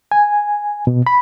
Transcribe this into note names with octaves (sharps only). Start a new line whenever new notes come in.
G#5
B2
B5